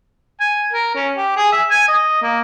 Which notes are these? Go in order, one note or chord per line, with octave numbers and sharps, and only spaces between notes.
G#5
A#4
C#4
G4
G#4
E5
G#5
D#5
A#3